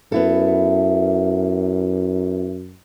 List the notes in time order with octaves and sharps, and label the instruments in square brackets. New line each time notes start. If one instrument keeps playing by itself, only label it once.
[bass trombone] F#2 [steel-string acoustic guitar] B3 E4 A4